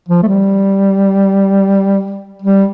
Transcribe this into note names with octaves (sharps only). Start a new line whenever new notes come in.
F3
A3
G3
G3